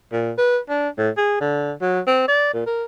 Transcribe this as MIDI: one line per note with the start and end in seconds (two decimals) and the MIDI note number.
0.12 0.31 46
0.38 0.58 71
0.69 0.89 62
0.97 1.09 45
1.17 1.38 68
1.41 1.72 50
1.81 2.00 54
2.07 2.23 60
2.28 2.53 74
2.54 2.64 46
2.66 2.84 70